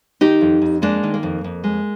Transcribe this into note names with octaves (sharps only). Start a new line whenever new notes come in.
D#3 D#4 G4
F2
F2
G#3 A#3 D4
D#3
A#3
F2
F2
G#3